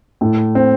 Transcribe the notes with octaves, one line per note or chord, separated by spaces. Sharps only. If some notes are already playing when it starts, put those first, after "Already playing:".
A2 A3
C4